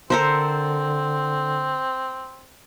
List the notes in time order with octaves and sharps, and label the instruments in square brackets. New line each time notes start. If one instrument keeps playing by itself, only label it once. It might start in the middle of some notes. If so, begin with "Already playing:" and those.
[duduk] D3 [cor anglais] C4 [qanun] A4 A#4 C5